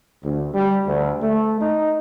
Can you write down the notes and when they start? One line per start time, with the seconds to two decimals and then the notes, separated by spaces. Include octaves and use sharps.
0.23 D2
0.53 G3
0.86 D2
1.22 A3
1.60 D#4